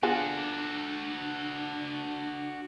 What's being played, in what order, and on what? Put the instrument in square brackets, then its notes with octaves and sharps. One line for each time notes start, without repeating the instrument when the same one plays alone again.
[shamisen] B3 F4 G#4 [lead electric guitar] D4 [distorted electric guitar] F#4 A4